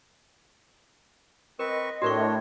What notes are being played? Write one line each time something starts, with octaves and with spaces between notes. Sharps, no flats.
C4 A#4 B4 D#5 C#6
A2 D4 F#4 A#4 C#5 C#6